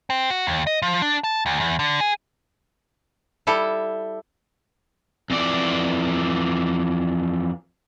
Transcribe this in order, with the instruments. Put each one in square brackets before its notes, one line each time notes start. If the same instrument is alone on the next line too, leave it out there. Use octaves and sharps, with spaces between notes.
[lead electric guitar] C4
F#4
D#2
D#5
F3
D4
A5
D2
E2
D3
G#4
[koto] G3 E4 A4
[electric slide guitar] F2 E3 D5